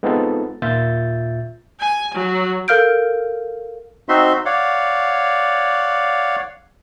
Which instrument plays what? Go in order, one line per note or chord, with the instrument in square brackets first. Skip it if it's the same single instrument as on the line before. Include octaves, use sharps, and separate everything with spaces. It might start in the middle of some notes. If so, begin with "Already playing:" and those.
[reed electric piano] G#3 B3 C4 D#4 F4 A4
D#2 A#2 F4 E5 G6 A6
[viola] G#5
F#3
[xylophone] A4 A#4 F5 F6 G6 D7
[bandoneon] C4 D#4 F#4 E5 C6
C#5 D5 F5 F#5